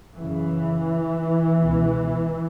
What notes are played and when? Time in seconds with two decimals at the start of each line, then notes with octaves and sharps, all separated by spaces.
0.18 F#2 C#3 E3
1.58 C#2 B2